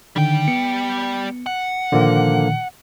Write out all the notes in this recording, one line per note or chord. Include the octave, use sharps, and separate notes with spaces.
D3 D#3 G3 G5
B3 C#7
F#5
A#2 D3 D#3 F3 A#3